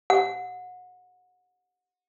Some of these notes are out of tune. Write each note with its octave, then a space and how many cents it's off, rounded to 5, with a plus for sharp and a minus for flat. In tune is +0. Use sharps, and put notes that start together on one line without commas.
F#5 -30